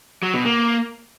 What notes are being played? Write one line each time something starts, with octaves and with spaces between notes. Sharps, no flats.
F#3
B2
A#3